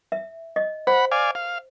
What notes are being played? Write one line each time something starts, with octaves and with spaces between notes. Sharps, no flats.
E5
D#5
C5 F#5 B5
D5 F5 G#5
F5